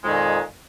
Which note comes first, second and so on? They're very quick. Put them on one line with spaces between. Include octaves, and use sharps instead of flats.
G#3 F2 D#3 A#2